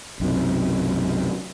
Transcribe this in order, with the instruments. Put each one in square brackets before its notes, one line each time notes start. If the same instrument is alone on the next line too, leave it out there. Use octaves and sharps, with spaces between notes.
[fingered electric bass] B1 F#2 C3